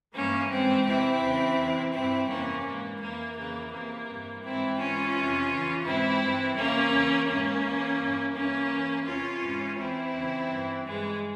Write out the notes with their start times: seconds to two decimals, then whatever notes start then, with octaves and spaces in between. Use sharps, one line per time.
0.14 G2 E3 A#3 C#4
0.50 G#2 E3 G#3 C4
0.86 E2 C3 E3 C4 E4
1.21 E2 C#3 E3
1.57 E2 C3 E3
1.93 G2 E3 C4 E4
2.29 F2 C3 E3 A#3 C#4
2.64 G#2 E3 A#3
3.00 F2 E3 A#3
3.36 F2 C#3 E3 A#3
3.71 E2 C3 E3 A#3
4.07 G2 E3
4.42 G#2 E3 C4 E4
4.78 G#2 E3 C#4 F4
5.14 F2 C3 E3
5.49 E2 C#3 E3
5.85 G#2 E3 C4 E4
6.21 G2 E3
6.56 E2 C3 E3 A#3 C#4
6.92 E2 C#3 E3
7.28 G#2 E3 A#3 C#4
7.63 E2 E3
7.99 G2 E3
8.35 G2 E3 A#3 C#4
8.71 E2 E3
9.06 E2 C3 E3 C#4 F4
9.42 G#2 E3
9.78 E2 E3 C4 E4
10.13 E2 C#3 E3
10.48 G2 E3
10.85 G2 E3 G#3